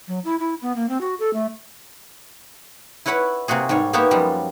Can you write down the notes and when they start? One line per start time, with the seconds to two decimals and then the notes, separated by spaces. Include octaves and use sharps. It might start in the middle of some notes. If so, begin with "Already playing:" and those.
0.08 F#3
0.25 E4
0.40 E4
0.62 B3
0.76 A#3
0.89 C4
1.01 F#4
1.20 A4
1.33 A3
3.06 E4 B4 C#5 F#5 B5
3.48 C3 A#3 F#4 G#4
3.69 G#2 G3 C#5
3.93 A#3 B3 D#4 G4 C#5 E5
4.11 F#2 F3 G3 G#3